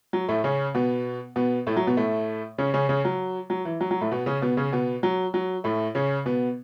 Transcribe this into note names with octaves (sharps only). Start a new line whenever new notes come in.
F#3
A2 A3
C#3 C#4
B2 B3
B2 B3
A2 A3
F#3
B2 B3
A2 A3
C#3 C#4
C#3 C#4
C#3 C#4
F#3
F#3
E3
F#3
F#3
A2 A3
B2 B3
C#3 C#4
B2 B3
C#3 C#4
B2 B3
F#3
F#3
A2 A3
C#3 C#4
B2 B3